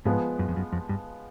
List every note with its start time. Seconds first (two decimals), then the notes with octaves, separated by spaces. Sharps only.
0.05 G#2 F3 G#3 B3
0.39 F#2
0.48 F2
0.56 F#2
0.72 F2
0.89 G2